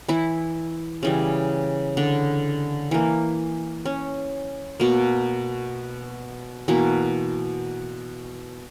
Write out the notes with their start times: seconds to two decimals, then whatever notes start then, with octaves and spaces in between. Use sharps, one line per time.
0.08 E3 E4
1.03 C#3 E3 G3
1.97 D3 D4
2.91 E3 A#3
3.86 C#4
4.80 B2 A#3
6.68 B2 E3 A#3 E4